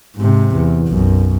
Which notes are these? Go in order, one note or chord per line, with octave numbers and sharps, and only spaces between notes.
G#2 C3
E2
B1 F#2